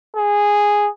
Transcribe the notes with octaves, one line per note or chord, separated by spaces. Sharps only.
G#4